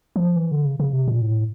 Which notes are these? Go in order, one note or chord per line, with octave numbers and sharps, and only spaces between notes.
F3
E3
D3
C#3
C#3
C3
A#2
A2